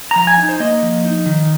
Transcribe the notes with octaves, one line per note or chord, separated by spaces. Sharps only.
F3 A#5
G#5
D#4
C5
A#3 D#5
F3
D#4
D#3